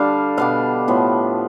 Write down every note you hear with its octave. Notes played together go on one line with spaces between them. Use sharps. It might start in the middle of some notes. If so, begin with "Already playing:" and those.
Already playing: D3 G3 D4 F5
B2 B3 D4 F5
A2 F3 B3